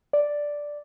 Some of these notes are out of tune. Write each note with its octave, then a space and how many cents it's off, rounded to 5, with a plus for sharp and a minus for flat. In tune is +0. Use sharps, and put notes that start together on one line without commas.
D5 +0